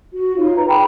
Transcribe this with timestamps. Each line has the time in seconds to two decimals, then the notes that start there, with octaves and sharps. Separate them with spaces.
0.15 F#4
0.37 D#4 F4 C#5 F5
0.55 B4 A#5
0.68 G#4 G5 A#5 B5